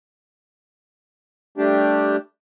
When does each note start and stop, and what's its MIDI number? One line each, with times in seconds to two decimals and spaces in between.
1.58 2.16 55
1.58 2.16 57
1.58 2.16 62
1.58 2.16 67